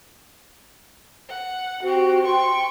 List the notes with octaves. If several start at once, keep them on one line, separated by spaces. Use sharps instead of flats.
F#5
C4 F#4 G4
G5 C6 C#6